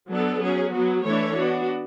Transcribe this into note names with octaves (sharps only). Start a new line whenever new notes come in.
F#3 B3 D4 A4
F#3 C#4 G#4
F#3 B3 F#4
E3 A3 D4 A4 C#5
B3 D4 F#4